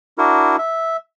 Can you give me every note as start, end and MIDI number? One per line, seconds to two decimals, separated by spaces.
0.18 0.56 62
0.18 0.56 64
0.18 0.56 66
0.18 0.56 70
0.58 0.97 76